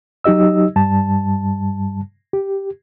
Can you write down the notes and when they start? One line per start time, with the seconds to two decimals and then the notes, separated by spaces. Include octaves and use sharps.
0.24 F#3 D#4 G4 D#5 E6
0.76 G2 G3 A5
2.33 G4